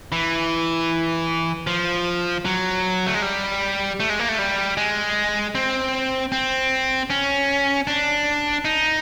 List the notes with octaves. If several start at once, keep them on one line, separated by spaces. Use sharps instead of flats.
E3
F3
F#3
A3
G#3
G3
A3
G#3
A#3
A3
G3
G#3
C4
C4
C#4
D4
D#4